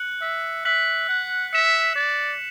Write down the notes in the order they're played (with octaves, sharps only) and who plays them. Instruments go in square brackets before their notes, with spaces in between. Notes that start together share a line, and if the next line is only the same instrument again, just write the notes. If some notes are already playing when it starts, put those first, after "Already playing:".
Already playing: [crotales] F#6 C#7 F#7
[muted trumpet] E5
[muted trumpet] E5 [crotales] F#6 B6 F#7
[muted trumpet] F#5
[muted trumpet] E5 [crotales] F#6 C#7 E7
[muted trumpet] D5